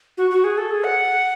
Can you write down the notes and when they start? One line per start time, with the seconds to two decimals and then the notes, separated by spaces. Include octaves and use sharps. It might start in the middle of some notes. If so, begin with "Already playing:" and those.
0.18 F#4
0.31 F#4
0.44 G#4
0.58 A4
0.71 G#4
0.84 F#5